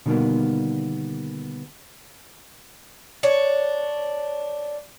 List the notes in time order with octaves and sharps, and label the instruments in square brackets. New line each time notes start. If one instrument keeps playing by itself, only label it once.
[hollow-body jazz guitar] B2 D3 D#3 G3 A#3 B3
[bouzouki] D4 C#5